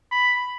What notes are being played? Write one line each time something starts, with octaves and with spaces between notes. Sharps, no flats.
B5